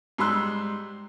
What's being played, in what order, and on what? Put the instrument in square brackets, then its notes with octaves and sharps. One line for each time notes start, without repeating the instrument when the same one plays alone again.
[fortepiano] G#2 G3 D#4 C6 E6 F#6